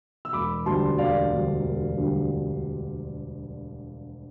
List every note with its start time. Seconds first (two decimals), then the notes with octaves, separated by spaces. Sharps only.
0.25 E6
0.33 E1 B5 D6
0.66 D2 D3 G3 A5 C6
0.98 E1 D5 F5
1.30 D2 D3 G3
1.63 E1
1.96 D2 D3 G3